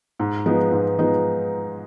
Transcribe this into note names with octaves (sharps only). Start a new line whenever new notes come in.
G#2
F3 G#3 B3 D#4
G#2
F3 G#3 B3 D#4